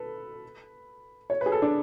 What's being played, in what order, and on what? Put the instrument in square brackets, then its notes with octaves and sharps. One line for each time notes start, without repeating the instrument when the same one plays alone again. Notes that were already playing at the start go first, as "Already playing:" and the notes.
Already playing: [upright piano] A4 B4
C#5
B4
G#4
A4
D4